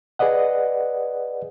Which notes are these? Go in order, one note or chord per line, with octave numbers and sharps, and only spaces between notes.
G#4 B4 D5 D#5 F#5